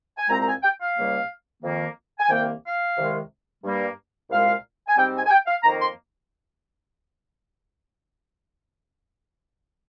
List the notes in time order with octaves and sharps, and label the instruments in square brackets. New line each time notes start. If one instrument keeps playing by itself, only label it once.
[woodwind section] G#5
C2 A#2 G#3 C4 A#5
A#5
G#5
G5
F5
C#2 C#3 G3 A#3
F2 D#3 A#3
G#5
C2 C3 D#3 A#3 G5
F5
C2 C3 D#3 G#3
G2 G3 A#3
C2 A#2 G#3 F5
G#5
G#2 G3 C4 G5
G#5
G#5
G5
F5
F2 D#3 A#3 A#5
C6